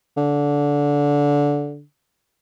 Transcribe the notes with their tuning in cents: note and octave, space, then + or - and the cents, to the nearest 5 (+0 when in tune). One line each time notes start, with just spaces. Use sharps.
D3 -15